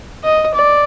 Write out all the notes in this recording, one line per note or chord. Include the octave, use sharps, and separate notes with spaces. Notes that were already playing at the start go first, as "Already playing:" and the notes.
D#5
D5